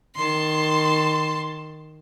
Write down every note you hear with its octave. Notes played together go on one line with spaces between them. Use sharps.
D#3 A5 C6